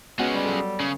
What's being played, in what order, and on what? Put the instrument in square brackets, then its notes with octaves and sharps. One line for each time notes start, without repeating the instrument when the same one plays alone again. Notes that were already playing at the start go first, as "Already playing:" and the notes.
[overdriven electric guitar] G#3 C#4 [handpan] B3 F#4 F#5
[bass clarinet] G3
[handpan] F#3 A4
[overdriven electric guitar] C#3